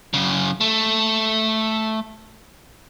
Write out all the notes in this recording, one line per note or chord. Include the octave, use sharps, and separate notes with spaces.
F#2 C#3
A3